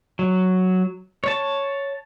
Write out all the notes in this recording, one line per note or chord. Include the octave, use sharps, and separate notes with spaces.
F#3
C#5 A5